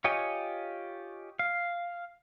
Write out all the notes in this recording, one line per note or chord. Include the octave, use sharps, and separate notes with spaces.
F4 G4 C#5 D#5 G#5
F5